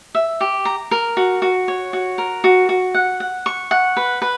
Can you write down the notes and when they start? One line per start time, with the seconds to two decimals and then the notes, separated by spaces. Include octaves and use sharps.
0.15 E5
0.41 G4
0.65 A#5
0.91 A#4
1.17 F#4
1.42 F#4
1.68 C#5
1.93 F#4
2.18 A#4
2.44 F#4
2.69 F#4
2.94 F#5
3.20 F#5
3.46 C#6
3.71 F#5
3.97 B4
4.22 B4